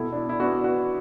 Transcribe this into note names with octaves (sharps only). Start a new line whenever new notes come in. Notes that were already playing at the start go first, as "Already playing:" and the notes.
Already playing: B2 E4 A4
D4
E4
E4
B3 D4 F#4
F#4 B4